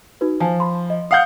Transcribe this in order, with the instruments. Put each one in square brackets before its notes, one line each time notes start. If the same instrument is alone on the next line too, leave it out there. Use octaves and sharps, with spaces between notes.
[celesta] D#4 F#4 B4
[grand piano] F3 [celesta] G#5 A5
[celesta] B5 C6
D#5
[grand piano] F5 F#5 G6 [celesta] D#6